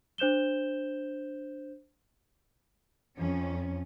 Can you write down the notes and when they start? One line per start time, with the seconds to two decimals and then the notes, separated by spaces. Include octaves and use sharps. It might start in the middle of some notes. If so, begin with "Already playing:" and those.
0.18 D4 C5 G6 E7 G7
3.17 F2 C#4